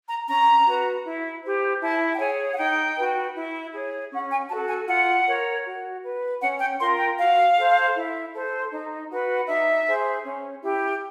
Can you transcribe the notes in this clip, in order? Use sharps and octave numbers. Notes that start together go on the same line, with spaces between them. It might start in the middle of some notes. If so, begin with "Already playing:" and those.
A#5
C#4 A#5
F#4 B4
E4
G4 C5
E4 A5
G5
G#4 C#5 G#5
F#5
D#4 G5
F#4 B4
E4
G#4 C#5
C#4 F#5
G#5
F#4 A4 A5
G#5
F4 F#5
A#4 C#5
F#4
B4
C#4 F#5
G5
F4 A#4 C6
G5
F#4 F5
A4 C5
E4
A4 C5
D#4
F#4 B4
D#4 E5
G#4 C5
C#4
E4 G4